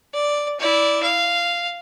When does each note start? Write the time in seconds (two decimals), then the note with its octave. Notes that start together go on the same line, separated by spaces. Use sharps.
0.13 D5
0.60 E4 D5
1.03 F5